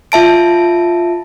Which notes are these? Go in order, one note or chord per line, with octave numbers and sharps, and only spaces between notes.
F4 E5 A5 D7